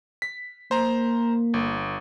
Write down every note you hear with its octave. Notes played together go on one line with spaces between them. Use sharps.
B6
A#3 C5 A#5
G1